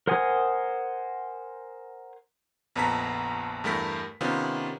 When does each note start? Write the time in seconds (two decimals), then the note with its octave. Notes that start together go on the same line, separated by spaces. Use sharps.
0.07 A#4 C5 F#5 G#5 D#6
2.76 A#1 F2 B3 A5 A#5 B6
3.64 E2 G2 A3 A#4 B6
4.21 C3 D#3 B3 C#4 F4